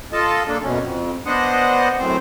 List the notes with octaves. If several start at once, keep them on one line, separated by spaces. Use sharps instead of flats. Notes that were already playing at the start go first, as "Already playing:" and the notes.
F4 A4 D#5 A5
A#3 D4 A4
F#2 B2 C#4
F2
B3 D4 C5 D#5 F#5
F#2 A2 C4 C5